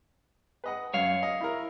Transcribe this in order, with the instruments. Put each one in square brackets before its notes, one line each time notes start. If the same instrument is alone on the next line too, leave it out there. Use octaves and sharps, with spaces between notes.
[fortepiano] B4 D#5 F#5
[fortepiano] F#2 [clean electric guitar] C#5 F5
[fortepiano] D#5
E4 A#4